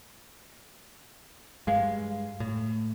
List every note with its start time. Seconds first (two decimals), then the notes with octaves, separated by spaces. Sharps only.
1.67 G2 G#3 F5
2.40 A2